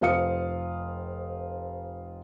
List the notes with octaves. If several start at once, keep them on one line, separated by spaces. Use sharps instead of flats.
F1 F4 C5 F5 D#6 C#7